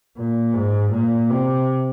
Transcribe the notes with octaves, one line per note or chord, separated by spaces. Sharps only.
A#2
G#2
A#2
C3